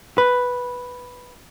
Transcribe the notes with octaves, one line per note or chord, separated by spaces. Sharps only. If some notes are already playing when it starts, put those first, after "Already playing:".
B4